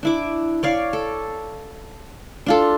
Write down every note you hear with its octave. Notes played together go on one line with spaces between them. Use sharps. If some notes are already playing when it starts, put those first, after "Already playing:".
D4 E4 D6
C#5 D5 F5
A4
D4 F4 A4